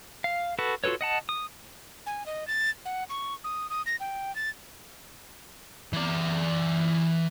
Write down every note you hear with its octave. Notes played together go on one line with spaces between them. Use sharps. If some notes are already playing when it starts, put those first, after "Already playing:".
F5
F#4 A4 B4 C#6
F4 F#4 A4 B4 C#5
D#5 F#5 A5
D#6
G#5
D#5
A6
F#5
C#6
D#6
D#6
A#6
G5
A6
E3 D5